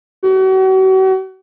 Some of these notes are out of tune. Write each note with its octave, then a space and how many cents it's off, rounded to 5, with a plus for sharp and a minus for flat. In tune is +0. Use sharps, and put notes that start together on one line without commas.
F#4 +40